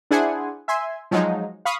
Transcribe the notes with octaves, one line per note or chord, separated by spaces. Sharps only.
D4 E4 G#4 C5 F#5 G#5
E5 G#5 C6
F3 F#3 G#3 D#4
F5 B5 C#6 D#6